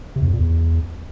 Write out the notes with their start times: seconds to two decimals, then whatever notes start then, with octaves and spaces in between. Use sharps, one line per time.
0.16 C3
0.22 E2
0.27 F2
0.33 A#2
0.39 E2